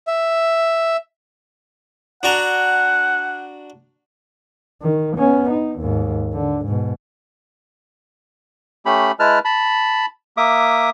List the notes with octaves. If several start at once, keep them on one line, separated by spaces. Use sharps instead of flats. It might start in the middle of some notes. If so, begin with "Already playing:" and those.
E5
D4 F#4 F#5 A#5
D#3
B3 C#4
D#4
D#2 G#2
D3
G#2 B2
A3 C#4 G4 B5
G#3 E4 B4 A5 F6
A5 B5
A#3 E5 D6 D#6